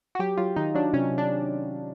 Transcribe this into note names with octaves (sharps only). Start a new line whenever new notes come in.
F#4
F#3 G4
F#3 F4
D#3 D#4
F#3 D4
C3 C#4
C3
D4